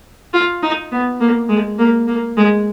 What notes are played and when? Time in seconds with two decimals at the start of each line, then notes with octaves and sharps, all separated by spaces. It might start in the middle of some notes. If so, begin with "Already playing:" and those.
0.33 F4
0.63 D#4
0.92 B3
1.21 A#3
1.49 G#3
1.79 A#3
2.08 A#3
2.37 G#3